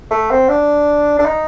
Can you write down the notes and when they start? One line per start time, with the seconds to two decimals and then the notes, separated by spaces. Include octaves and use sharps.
0.11 A3
0.31 C4
0.49 D4
1.19 D4
1.26 D#4